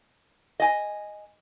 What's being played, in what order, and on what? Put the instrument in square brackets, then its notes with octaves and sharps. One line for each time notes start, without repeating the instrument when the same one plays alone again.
[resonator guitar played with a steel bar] D#5 G#5